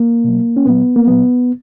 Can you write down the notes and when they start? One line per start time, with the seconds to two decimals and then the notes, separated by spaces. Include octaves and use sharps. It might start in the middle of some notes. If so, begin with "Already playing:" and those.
Already playing: A#3
0.24 B2 F#3
0.57 C#4
0.65 A#2 F#3 B3
0.96 A#3
1.07 A#2 F#3 B3